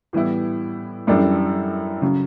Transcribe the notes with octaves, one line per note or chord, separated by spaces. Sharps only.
A2 E3 G3 B3 E4
F#2 E3 G3 D4 A4
C#3 F#3